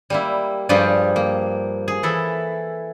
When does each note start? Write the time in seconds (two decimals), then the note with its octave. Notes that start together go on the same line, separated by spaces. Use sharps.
0.10 G3 A#3 E4
0.69 G2 F3 G3 G4 G#4
1.16 A#3
1.88 G#4
2.03 E3 E4 A4